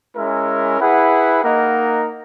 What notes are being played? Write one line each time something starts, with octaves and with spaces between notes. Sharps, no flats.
G#3 C#4 E4 A#4 E5
E4 G#4 B4 F#5
A#3 D#4 A#4 D#5 F#5